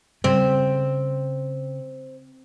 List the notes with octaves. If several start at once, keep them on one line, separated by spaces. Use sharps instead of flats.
C#3 G3 C4